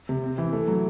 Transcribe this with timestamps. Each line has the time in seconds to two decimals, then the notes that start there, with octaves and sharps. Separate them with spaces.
0.09 C3
0.24 C4
0.38 E3
0.53 A3
0.68 F#3